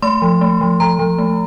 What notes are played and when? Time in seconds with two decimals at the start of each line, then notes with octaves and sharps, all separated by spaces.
0.02 A3 C6
0.22 F3
0.41 A3
0.61 F3
0.80 F3 A#5
0.99 F3
1.18 A3